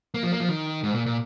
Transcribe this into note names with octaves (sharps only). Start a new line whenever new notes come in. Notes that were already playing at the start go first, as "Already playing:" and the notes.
A#3
F3
A#3
F3
D#3
G#2
A#2
A#2